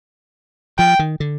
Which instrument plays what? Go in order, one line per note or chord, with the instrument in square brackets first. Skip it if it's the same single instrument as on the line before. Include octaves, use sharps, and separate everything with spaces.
[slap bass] F3 [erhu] G5
[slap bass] D#3
D3